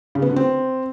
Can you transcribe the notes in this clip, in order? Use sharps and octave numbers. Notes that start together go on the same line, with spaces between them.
C#3
B3
D3
C4